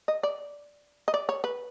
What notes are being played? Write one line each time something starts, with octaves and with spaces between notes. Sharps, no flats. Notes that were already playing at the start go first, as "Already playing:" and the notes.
D#5
D5
D#5
D5
C#5
B4